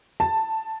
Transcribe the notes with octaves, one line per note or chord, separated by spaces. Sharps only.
A5